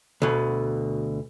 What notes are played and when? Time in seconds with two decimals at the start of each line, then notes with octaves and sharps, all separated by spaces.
0.22 D2 B2